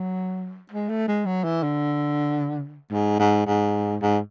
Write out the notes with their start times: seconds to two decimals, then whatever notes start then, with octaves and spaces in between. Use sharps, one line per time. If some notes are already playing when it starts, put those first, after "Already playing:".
Already playing: F#3
0.71 G#3
0.89 A3
1.08 G#3
1.26 F#3
1.44 E3
1.63 D3
2.92 G#2
3.19 G#2
3.47 G#2
4.02 G#2